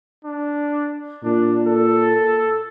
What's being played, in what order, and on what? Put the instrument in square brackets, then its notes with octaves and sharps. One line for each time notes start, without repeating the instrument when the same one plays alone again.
[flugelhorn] D4
[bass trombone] A#2 [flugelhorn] D4
[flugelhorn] A4